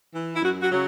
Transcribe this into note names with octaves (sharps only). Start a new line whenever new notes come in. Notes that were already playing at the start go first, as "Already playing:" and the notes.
E3
E4
F#2 F#4
F#4
C#3 F#3